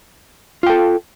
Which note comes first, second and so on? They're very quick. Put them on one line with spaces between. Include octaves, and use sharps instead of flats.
F4 G5 A4